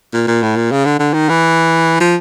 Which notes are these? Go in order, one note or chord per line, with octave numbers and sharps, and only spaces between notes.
A#2
A#2
A2
A#2
C#3
D3
D3
D#3
E3
F3